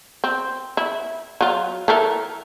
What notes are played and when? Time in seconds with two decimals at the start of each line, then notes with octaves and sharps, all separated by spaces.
0.24 C4
0.77 E4
1.41 F#3 F4
1.88 E3 A4 A#4